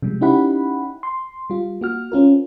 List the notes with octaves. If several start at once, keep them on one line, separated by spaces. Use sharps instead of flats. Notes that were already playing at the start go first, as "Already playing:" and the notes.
C3 F3 G3 G#3
C#4 D#4 E4 G4 F#5 B5
C6
G3 F4
A#3 F#4 F6
C4 C#4 F4 A#4